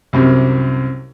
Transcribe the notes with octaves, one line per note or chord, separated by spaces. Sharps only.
C2 F#2 C3